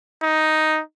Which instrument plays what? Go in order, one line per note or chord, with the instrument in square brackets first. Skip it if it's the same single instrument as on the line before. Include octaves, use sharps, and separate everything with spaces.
[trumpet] D#4